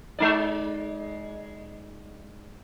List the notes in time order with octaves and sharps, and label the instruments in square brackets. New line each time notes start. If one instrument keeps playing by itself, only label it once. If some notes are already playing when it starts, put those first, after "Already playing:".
[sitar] G#3 D#4 D5